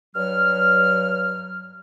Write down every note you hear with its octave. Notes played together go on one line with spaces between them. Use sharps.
G2 F#3 F6